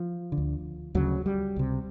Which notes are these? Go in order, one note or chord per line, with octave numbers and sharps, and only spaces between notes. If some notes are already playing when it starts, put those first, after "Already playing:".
Already playing: F3
D3
D2
D2 C#3 F#3
G3
C#2 C3